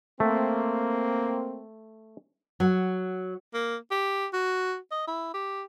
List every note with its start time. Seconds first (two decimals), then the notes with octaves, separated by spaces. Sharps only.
0.20 A3 A#3 C4
2.60 F#3
3.54 A#3
3.91 G4
4.33 F#4
4.91 D#5
5.07 E4
5.34 G4